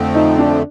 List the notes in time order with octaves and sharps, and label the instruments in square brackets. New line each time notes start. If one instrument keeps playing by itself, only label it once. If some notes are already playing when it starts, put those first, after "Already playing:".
Already playing: [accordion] F2 D3 F3 A3 C4
[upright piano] D#4
D4